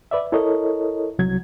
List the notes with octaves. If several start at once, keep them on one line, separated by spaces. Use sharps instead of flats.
B4 D5 E5
E4 A4 A#4 C#5 D#5
C2 F#3 G#6